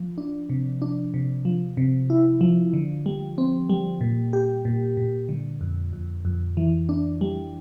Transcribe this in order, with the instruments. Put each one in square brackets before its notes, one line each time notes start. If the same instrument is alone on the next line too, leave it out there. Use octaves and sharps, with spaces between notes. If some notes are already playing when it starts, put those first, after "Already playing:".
Already playing: [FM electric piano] F3
D4
C3
D4
C3
F3
C3
E4
F3
D3
G3
C4
G3
A#2
G4
A#2
A#2
D3
F2
F2
F2
E3
D4
G3